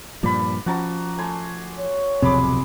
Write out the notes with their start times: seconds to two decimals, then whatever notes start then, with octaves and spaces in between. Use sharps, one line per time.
0.23 G2 A#2 F3 D5 B5
0.66 F3 C#4 F#4 A5 A#5
1.18 A3 G#5 C6
1.78 C#5
2.22 D1 B1 F2 C3 G#4 B5 D6